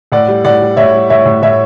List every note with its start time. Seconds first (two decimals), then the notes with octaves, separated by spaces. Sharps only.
0.12 A2 D5 F#5
0.28 G3
0.44 A2 D5 F#5
0.62 G3
0.77 A2 C#5 E5
0.94 G3
1.10 A2 C#5 E5
1.25 A2
1.42 A2 C#5 E5